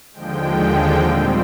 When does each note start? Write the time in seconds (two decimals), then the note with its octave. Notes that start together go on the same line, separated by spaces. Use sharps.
0.13 D#2 D3 F3 G#3 G5
0.55 G5
0.98 A#2 G3 C4